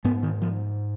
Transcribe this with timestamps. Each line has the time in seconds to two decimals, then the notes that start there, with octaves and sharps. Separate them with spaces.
0.04 G#2 B3
0.23 D#3
0.42 F3